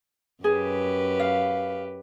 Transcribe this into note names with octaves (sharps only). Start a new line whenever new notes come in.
F#2 G4 G#4 B4
F5